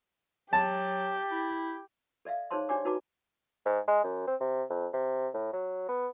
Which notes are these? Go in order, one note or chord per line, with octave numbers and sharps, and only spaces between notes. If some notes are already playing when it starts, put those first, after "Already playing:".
F#3 G4 A5
E4
A4 D5 E5 F5
D#4 G#4 C5 C#5 A5 C6
D4 G4 C#5 D5 G#5 D6
D#4 F#4 B4 A5 A#5 D6
G#2
G#3
F#2
C4
C3
F2
C3
A2
F#3
B3